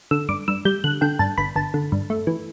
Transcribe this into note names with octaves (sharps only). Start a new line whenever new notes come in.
D3 E6
G2 D6
G2 E6
G3 G6
D3 F#6
D3 G5
G2 A5
G1 B5
G1 A5
D3
G2
A3
E3